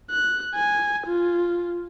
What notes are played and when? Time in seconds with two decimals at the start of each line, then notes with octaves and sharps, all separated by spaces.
0.11 F#6
0.55 G#5
1.07 F4